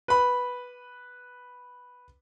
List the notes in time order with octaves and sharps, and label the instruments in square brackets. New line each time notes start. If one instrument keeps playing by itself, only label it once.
[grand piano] B4 B5